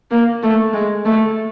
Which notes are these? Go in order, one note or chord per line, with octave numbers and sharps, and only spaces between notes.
A#3
A3
G#3
A3